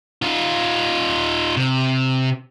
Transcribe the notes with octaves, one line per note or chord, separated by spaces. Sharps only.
D#4 F4
C3